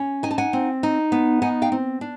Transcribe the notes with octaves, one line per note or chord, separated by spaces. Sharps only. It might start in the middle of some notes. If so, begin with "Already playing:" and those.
Already playing: C#4
D#4 G#5
A5
F#5 G#5
C4
D#4
B3
D#4 F#5 G#5
F5 G5
C4
D4